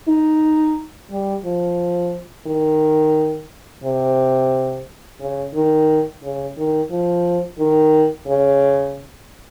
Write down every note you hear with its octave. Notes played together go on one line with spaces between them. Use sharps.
D#4
G3
F3
D#3
C3
C#3
D#3
C#3
D#3
F3
D#3
C#3